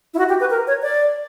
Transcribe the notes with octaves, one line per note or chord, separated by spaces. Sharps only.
E4
F#4
G4
B4
A#4
C#5
D5